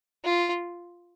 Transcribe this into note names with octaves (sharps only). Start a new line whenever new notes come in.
F4